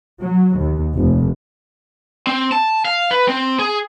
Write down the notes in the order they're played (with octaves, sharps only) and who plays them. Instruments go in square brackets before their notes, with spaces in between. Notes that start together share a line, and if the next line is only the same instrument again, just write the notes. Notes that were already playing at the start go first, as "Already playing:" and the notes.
[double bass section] F#3
D#2
F1
[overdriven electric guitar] C4
A5
F5
B4
C4
G#4